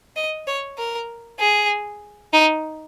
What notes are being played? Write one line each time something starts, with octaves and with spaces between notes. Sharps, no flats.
D#5
C#5
A#4
G#4
D#4